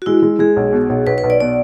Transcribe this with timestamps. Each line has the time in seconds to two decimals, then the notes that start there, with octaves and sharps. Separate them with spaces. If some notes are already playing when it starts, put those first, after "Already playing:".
0.02 F#4
0.06 G#3 E4
0.22 G#3
0.39 G#3 G#4
0.56 B1
0.73 B2
0.89 B1
1.07 B1 B4
1.18 B4
1.24 B1
1.30 D5
1.40 B2 D5